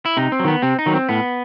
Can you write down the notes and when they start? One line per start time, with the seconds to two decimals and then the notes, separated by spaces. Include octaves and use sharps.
0.05 E4
0.17 C3 D#4
0.32 C4
0.39 F#3
0.45 D#3 B3
0.62 C3 C4
0.79 D#4
0.86 D#3 F#3
0.93 C4
1.09 A2 B3